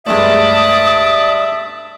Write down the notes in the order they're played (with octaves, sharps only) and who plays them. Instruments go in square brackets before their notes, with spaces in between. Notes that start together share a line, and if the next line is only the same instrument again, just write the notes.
[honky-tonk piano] G2 G#3 A3 [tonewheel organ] D5 A5 [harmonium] E5 [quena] D#6